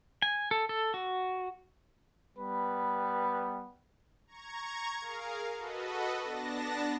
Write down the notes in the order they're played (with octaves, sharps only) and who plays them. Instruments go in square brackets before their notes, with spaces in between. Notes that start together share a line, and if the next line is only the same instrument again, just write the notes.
[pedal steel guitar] G#5
A4
A4
F#4
[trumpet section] G3 B3 B4
[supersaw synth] A#5 C#6 G#6
G#4 A#4 F5
F#4 A4 B4 D#5
B3 D4 A5 A#6